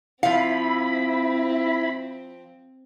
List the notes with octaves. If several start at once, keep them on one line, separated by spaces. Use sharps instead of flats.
F3 C4 E4 F5 B5